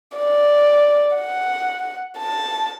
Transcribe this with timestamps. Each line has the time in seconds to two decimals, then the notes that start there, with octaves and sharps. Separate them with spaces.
0.17 D5
1.15 F#5
2.18 A5